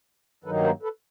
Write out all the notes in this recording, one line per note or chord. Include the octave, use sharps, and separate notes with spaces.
G2 D#3 F#3 A#3 D#4 A4 B4
A#4 C5
A4 B4